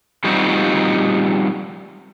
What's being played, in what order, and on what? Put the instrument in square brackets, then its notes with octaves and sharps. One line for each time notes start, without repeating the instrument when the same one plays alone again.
[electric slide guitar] F3 G3 C4 D#4 F4 F#4